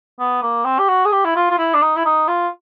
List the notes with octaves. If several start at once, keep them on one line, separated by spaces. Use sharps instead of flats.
B3
A#3
C4
G4
F#4
G#4
G4
E4
F4
F4
E4
D4
D#4
E4
D#4
F4